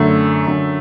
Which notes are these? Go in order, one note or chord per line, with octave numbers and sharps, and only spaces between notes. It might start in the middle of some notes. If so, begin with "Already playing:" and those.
Already playing: F#2 D3 A3
F#2 D3